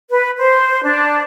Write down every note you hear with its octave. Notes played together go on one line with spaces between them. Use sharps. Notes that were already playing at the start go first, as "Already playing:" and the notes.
B4
C5
D4